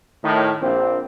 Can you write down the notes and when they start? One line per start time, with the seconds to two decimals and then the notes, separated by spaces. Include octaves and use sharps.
0.24 A2 D#3
0.62 A#1 C4